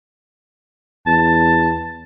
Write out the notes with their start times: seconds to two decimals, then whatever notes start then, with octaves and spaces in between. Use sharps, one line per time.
1.07 E2 A5